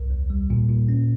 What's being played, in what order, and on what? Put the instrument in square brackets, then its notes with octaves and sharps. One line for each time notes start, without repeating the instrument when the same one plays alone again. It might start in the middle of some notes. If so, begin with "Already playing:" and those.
Already playing: [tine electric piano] C2
D#2
G3
A#2
A#2
C#4